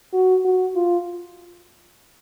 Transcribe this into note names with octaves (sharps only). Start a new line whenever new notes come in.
F#4
F#4
F4